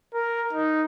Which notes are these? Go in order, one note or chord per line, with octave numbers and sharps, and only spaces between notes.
A#4
D#4